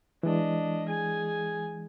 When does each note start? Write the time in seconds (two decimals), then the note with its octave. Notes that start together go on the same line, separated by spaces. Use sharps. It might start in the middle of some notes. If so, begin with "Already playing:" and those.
0.23 E3 G#3 D4 D#5
0.88 G#4 G#5